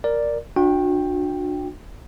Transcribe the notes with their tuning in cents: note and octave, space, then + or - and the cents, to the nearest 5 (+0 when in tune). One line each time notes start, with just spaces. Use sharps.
A#4 +0 D5 +0
D4 +15 F#4 -35 G5 +5